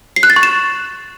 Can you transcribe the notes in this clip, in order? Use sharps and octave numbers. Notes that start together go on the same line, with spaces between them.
C7
F#6
A6
C#6
E7